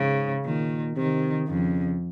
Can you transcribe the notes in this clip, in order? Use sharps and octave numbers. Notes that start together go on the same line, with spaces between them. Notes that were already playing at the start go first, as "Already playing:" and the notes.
Already playing: G#2 C#3
A#2 D#3
C3 D#3
F2 C#3